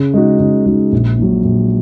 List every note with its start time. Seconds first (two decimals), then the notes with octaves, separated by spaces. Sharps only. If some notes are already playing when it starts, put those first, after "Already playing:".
Already playing: C#3
0.14 G#3 D#4 F#4
0.40 C#3
0.66 G#3 D#4 F#4
0.92 A#1
1.19 A#2 F#3
1.45 A#1